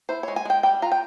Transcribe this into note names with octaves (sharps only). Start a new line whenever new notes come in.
E4 C5
C#5
G#3
G#5
G#3 G5
G3 G5
F4 A#5
G5